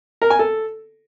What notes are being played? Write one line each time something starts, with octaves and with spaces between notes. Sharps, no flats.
A#4
G#5
A4